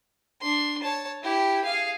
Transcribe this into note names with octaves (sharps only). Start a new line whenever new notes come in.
D4 C6
C#5 A5
E4 G4
G#4 F5